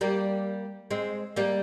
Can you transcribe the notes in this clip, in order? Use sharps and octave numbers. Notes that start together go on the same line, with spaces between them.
G3 A#3
G#3 C4
G3 A#3